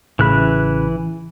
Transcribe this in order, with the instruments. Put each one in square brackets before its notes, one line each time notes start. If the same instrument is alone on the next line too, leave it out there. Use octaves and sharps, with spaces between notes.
[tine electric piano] A1 C#3 B5 [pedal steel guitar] E3 F#6